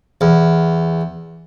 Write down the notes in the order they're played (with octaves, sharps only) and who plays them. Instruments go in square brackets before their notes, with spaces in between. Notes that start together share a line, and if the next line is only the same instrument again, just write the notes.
[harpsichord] E2